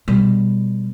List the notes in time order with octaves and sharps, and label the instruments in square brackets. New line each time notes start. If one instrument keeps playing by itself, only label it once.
[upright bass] B2 G3